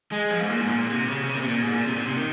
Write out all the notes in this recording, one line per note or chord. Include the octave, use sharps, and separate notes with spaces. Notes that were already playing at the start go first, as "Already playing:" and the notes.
G#3
F3
G#2
A#2
G#2
A#2
C3
C#3
C3
A#2
C3
A#2
G#2
A#2
C3
A#2
C3
D#3